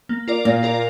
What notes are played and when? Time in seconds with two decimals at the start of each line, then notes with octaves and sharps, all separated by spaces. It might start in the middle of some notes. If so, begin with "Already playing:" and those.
0.09 A#3
0.28 F4 A#4 D5
0.45 A#2 A#3
0.63 F4 A#4 D5